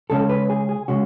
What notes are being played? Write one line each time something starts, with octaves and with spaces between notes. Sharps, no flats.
C#3 G#3 C#4 A4
B4
G#4
G#4
C#3 G#3 C#4 F#4